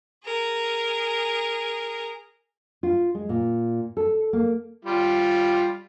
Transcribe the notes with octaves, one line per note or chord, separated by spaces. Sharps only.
G#4 A#4
F4
G#3
A#2
A4
A#3
G3 F4